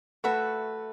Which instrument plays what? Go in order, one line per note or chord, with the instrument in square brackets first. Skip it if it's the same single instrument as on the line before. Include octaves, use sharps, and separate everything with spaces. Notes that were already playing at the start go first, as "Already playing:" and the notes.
[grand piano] A3 A4 [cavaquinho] F#4 B4 E5 B5